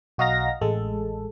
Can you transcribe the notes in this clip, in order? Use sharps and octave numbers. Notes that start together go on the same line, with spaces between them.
B1 F#4 D#5 F5 A#5 A#6
A1 G#3 A4